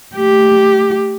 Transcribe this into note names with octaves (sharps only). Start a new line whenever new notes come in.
A3 G4